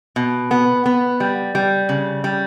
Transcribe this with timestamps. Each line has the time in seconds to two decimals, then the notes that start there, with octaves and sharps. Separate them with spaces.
0.16 B2
0.51 B3
0.86 B3
1.20 G3
1.55 G3
1.89 C#3
2.24 G3